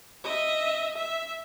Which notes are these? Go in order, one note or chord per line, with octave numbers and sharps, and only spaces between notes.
D#5 E5
E5